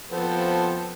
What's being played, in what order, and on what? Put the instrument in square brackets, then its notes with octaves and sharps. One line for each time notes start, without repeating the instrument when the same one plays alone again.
[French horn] F3 [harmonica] B3 C4 A4